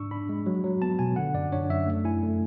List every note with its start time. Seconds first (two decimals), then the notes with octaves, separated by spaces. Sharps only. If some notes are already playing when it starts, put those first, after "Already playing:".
Already playing: G#2 D4 C#6 E6
0.11 D4 B5
0.29 G#3
0.46 F#3
0.64 F#3
0.82 B3 A5
0.99 B2 G#5
1.16 D3 F#5
1.34 F#2 D5
1.52 D4 C#5
1.70 F#2 E5
1.87 A3
2.05 E4 G#5
2.23 A3